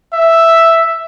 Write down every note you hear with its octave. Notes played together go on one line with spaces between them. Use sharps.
E5